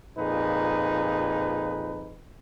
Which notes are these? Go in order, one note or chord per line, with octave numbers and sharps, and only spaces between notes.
F2 A#2 D#4 G#4 B4